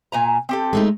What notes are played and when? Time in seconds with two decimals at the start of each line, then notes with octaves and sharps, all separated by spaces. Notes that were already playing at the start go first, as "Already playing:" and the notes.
0.12 A#2 G#5 A#5
0.49 C4 G4 A4
0.73 G#3 A3 D#4